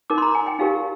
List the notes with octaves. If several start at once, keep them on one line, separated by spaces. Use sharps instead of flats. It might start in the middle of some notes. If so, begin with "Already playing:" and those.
D#4 A#4 D6
C6
A#5
G#5
G5
D#4 G4 A#4 F5